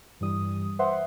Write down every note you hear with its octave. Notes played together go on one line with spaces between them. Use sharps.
G2 E3 G3 D#6
B4 C5 E5 F#5 C6